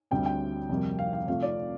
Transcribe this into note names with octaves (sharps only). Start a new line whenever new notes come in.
D2 D3 G3 C4 G5
G5
F2 C3 G3 A#3
F5
F5
F2 C3 F3 A3 F5
D5